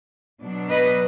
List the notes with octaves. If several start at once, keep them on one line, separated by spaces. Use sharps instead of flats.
B2 F#3 D4
B4 D#5